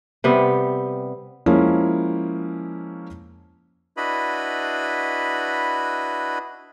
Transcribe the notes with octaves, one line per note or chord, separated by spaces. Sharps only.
C3 G3 B3
F3 G#3 A#3 C#4 E4
D4 E4 F#4 B4 D#5 B5